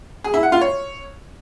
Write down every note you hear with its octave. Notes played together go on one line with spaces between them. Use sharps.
G#4
E4
F#5
F4
C#5